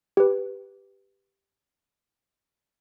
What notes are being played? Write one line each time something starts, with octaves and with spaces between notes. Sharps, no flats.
G4 B4